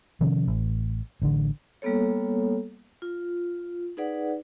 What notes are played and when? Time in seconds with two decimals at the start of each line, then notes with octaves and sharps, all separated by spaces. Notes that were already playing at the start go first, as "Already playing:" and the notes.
0.21 C3 D#3 F3 C#4
0.48 A1
1.22 A1 D3
1.82 G3 A#3 B3 A4 C#5
3.02 F4
3.97 D#4 G#4 B4 D5 F#5